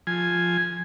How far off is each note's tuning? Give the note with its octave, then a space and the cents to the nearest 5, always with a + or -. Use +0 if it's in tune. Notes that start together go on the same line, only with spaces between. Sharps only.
F3 +0 G#5 +0